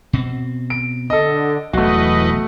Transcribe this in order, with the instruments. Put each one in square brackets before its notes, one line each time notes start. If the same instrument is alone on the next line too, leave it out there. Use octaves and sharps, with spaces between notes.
[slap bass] B2 C4
[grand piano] D7
[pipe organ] D3 [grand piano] A4 D#5
[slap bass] E1 B1 [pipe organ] E2 B4 D#5 [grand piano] A3 F#4